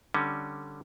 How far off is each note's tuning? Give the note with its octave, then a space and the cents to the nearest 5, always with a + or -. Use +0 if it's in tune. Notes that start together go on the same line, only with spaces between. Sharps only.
D3 +5 G3 +0 C#4 +0